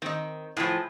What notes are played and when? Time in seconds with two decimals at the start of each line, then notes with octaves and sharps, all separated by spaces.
0.02 D#3 C4 D#4
0.57 A2 F3 G#4 B4 C#5